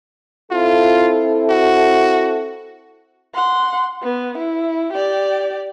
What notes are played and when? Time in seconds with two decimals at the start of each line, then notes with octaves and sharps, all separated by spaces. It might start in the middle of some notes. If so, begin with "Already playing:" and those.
0.51 C4 E4 F4 A4
1.50 F#4
3.35 F#5 C6
4.03 B3
4.38 E4
4.93 G4 D5